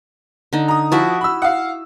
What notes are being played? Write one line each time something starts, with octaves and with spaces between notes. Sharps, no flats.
D3 D#4
A#5 D#6
F3 E4 F#4 E5
B5 E6
F5 F#5